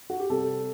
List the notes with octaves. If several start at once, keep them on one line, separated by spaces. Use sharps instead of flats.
F#4
G4
C3 G3 C4 A4